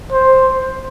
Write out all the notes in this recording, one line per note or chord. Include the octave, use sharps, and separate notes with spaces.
C5